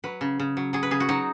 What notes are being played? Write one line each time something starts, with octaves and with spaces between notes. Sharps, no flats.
F#3 B4
C#3
C#3
F#3
F#3 G#4
B4
C#3 G#4
F#4
F#3 D#4